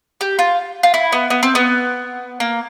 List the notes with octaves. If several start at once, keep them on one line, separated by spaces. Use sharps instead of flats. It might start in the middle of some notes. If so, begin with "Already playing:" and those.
G4
F4
F4
E4
B3
B3
C4
B3
A#3